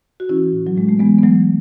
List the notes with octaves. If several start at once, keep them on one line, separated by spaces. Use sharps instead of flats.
F#4
E3 C#4 E4
A2
F#3
A2 G#3
A3
E3 G#3 B3
B3
E3 F#3 A3